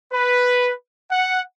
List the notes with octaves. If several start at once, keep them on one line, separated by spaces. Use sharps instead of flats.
B4
F#5